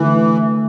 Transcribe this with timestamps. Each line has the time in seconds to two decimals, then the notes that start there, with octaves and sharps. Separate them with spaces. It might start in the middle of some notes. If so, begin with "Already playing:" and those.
Already playing: D3 E3 A3 E4